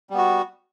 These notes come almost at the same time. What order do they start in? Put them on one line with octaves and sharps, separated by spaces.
G3 B3 F#4